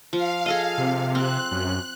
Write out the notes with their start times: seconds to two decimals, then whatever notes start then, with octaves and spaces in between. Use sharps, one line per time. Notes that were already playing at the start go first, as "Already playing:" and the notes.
0.13 F3 F5
0.46 G#4 A4 D#5
0.78 C3
1.15 C4 F#6
1.51 F#2